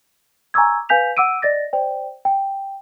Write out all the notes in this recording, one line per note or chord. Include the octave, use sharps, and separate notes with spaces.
G#5 A#5 C#6 D6 E6 G#6
B4 F5 G#5 G6 B6 F7
F#5 D6 E6 D7 D#7
D5 D#5 A6 A#6
C5 D5 G5
G5